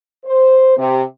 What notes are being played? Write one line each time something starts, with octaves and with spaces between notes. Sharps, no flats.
C5
C3